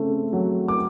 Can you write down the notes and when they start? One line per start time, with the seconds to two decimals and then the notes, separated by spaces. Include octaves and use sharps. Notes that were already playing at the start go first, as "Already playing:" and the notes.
Already playing: C#3 A3 C4
0.33 F#3
0.68 D6